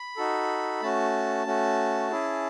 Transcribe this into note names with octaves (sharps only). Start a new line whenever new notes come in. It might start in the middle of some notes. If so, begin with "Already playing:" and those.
Already playing: B5
D#4 F#4 A4
A3 C#4 F#4 A5
A3 C#4 F#4
C#4 E4 G#4